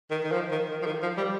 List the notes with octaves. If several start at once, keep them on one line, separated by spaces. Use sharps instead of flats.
D#3
D#3
F3
D#3
D#3
F3
D#3
F3
G3